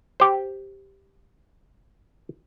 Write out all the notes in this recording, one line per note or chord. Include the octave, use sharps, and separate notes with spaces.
G4 C5